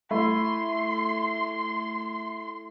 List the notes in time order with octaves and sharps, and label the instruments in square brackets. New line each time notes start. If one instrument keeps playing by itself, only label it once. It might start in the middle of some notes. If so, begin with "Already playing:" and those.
[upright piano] A3 [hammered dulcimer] E4 [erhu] C6